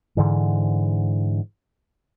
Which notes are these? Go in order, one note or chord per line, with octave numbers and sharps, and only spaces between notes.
G#2 D3 E3